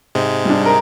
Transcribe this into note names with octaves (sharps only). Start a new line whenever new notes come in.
G#2 C3 G#3
G3 D4
A#4